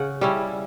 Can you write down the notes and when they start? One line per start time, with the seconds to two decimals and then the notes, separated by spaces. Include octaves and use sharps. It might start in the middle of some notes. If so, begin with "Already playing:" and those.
Already playing: C#3 F#5
0.21 G3 C#4 E4